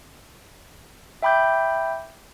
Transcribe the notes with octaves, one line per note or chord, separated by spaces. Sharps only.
E5 G5 B5 D6 G6